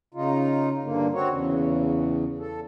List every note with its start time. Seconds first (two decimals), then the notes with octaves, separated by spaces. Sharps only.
0.14 C#3 D#4 F4
0.84 G2 D3 A#3
1.14 C4 F#4 C#5
1.29 E2 C#3
2.39 A4